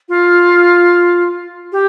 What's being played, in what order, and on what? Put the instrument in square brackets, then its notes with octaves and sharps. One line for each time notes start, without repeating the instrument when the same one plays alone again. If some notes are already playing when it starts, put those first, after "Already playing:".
[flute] F4
G4